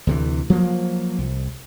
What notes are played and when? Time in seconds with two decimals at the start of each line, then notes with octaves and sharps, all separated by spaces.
0.07 D2 C3 E3
0.50 F3 F#3 A#3
1.18 C2